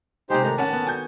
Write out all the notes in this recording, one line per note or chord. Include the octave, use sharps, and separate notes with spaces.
C3 G#3 D#4 G4 C5
A2 D#3 D4 A#5
C#4 B4 F#5 A5
B3
F#4 G#5 G6